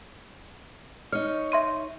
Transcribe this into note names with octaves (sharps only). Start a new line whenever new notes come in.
D#4 C#5 F6
E5 C6 D#7